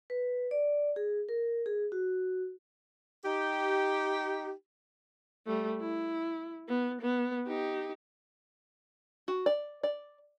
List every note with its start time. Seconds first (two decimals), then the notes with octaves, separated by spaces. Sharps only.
0.10 B4
0.51 D5
0.96 G#4
1.29 A#4
1.66 G#4
1.92 F#4
3.24 D#4 G4
5.46 G3 A3
5.80 E4
6.68 B3
7.01 B3
7.48 D#4 G4
9.28 F#4
9.46 D5
9.83 D5